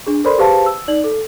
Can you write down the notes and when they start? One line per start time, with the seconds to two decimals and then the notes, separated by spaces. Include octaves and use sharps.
0.07 D4 G#4
0.24 A4 A#4 C5 D5 B5 C6
0.38 G4 G#4 B4 C5 F5 A5
0.66 E6
0.88 D#4 D5 F#7
1.04 A4